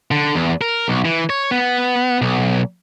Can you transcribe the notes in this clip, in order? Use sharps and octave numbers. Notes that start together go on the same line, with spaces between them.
D3
E2
A#4
B1
E3
C#5
B3
B1